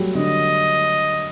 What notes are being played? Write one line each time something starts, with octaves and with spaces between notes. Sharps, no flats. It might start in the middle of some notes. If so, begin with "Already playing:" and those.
Already playing: F#3 G3 A3
D3 D#5